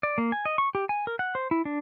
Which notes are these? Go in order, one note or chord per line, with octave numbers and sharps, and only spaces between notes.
D5
A#3
G#5
D#5
C#6
G4
G#5
A#4
F#5
C5
E4
D4